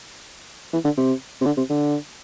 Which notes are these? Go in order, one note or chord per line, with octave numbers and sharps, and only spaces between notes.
E3
D3
C3
C3
D3
C3
D3